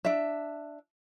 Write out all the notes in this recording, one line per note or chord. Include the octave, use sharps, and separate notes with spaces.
D4 E5